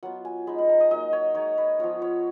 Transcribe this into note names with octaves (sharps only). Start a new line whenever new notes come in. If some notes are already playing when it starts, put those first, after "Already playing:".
F#3 B3 F4 F#5
G#5
G#3 D#4 B5
B5
A#5
D#5
F#3 A#3 D#4 D#5
C#5
G#3 D#4 C#5
B4
F3 B3 F4 C#5
C#5